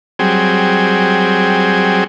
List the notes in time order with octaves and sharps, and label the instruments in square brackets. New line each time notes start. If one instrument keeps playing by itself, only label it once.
[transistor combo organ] F#3 G3 C4 G#4